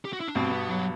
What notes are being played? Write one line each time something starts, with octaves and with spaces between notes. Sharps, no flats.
G4
F#4
E4
D4
G2 B2 C4
B3
F#3